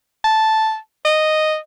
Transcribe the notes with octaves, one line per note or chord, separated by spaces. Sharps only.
A5
D#5